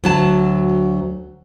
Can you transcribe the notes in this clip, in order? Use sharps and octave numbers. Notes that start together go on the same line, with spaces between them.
D2 F#3 A5